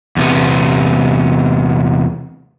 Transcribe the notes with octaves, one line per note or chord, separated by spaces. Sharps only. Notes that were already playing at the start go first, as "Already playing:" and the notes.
E2 C3 B3